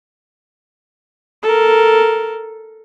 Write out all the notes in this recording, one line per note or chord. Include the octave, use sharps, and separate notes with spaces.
A4 A#4